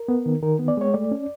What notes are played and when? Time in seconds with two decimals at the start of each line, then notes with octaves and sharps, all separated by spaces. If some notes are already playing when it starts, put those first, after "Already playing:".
Already playing: A#4
0.08 B3
0.26 D#3
0.43 D#3 A#4
0.59 B3
0.68 D5
0.77 G#3 C#5
0.94 A3 D5
1.11 C#4